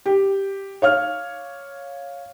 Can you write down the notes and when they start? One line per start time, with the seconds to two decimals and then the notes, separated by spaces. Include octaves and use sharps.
0.06 G4
0.82 C#5 F5 F6